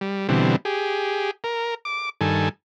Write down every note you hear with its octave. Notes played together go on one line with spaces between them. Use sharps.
G3
B2 D3 E3 G3 C4
G4 G#4
A#4
D6
G2 D#3 A4 G#5